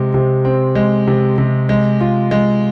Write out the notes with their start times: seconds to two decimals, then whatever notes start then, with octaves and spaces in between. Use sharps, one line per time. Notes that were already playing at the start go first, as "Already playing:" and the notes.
Already playing: C3 G#3
0.14 C3
0.45 C4
0.75 G#3
1.07 C3
1.38 C3
1.69 G#3
2.01 F4
2.31 G#3